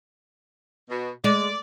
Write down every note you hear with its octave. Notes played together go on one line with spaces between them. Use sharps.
B2
G#3 D5